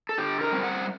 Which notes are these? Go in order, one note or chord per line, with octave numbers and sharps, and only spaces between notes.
A4
D3 G4
A#4
G3 C4
F#5